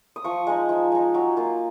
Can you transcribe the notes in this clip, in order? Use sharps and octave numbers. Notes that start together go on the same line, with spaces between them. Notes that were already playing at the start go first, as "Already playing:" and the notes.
D#6
F3 C#6
G#3 D#4
F3
G#3 D#4
F#3
A#3 F4